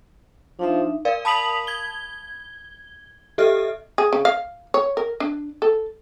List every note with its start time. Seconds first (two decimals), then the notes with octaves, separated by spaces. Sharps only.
0.59 F3 D4 D#4 E5
1.05 A#4 D5 F5
1.25 A5 B5 D#6 B6 F7 F#7
1.67 G#6 G7
3.38 G4 A4 D#5 E5 F6
3.98 G#4
4.13 C#3
4.25 F5
4.74 C#5
4.97 A#4
5.20 D4
5.62 A4